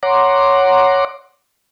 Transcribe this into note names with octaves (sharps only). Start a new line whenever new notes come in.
C#5 F#5 A#5 C6 D6